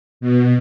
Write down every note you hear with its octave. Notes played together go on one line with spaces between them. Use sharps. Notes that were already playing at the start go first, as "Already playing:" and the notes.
B2